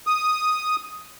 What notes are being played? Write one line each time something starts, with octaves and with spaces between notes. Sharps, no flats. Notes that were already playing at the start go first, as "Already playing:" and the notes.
D#6